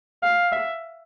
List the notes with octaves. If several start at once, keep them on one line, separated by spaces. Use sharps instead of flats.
F5
E5